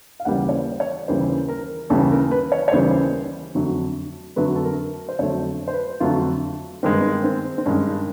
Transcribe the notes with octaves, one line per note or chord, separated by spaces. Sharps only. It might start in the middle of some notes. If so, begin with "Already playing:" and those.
F5
D#2 C#3 E3 G3 A#3 F#5
C#5
C5
C#5
D#2 C#3 E3 G3 A#3 C5
A#4
D#2 C#3 E3 G3 A#3 A4
A#4
B4
C#5
C#5
D#2 C#3 E3 G3 A#3 C5
F2 D3 F#3 A3
F2 D3 F#3 A3 B4
A4
A#4
C5
F2 D3 F#3 A3 C#5
C5
B4
F2 D3 F#3 A3 F4
G2 D#3 G#3 C4
B3
C4
C4
C4
G2 D#3 G#3 C#4